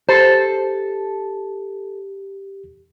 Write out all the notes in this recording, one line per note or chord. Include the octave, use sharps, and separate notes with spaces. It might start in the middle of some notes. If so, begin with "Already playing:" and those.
G4 A4 C5